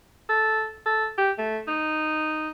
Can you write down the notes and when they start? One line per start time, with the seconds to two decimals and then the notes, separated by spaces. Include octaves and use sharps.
0.29 A4
0.86 A4
1.18 G4
1.38 A3
1.68 D#4